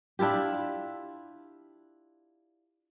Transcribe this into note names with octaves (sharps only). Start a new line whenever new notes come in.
D4 E4 F4 G4